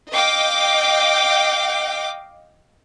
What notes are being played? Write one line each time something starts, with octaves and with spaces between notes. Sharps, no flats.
D#5 F5 G5 D6